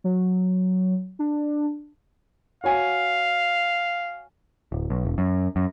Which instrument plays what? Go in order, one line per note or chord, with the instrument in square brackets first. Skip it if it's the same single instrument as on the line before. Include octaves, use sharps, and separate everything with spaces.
[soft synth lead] F#3
D4
[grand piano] F#4 C#5 G#5 [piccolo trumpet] F5
[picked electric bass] D1
B1
E1
F#2
F#2